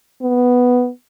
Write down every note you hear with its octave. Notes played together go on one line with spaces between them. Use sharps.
B3